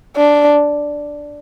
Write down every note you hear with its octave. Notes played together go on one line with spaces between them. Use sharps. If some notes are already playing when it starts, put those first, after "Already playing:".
D4